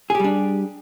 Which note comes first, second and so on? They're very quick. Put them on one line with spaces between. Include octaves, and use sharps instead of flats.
G#4 G4 G3 D4